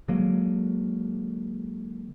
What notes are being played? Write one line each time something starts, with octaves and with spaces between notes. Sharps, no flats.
D3 F#3 G#3 A#3